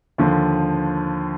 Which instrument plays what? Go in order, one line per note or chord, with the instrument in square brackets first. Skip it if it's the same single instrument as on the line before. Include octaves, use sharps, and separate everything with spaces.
[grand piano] D#2 D3 F3